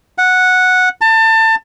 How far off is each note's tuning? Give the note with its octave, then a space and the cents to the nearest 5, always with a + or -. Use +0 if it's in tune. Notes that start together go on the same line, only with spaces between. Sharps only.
F#5 -5
A5 +25